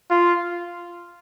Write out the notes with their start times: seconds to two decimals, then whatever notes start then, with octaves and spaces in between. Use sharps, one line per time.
0.11 F4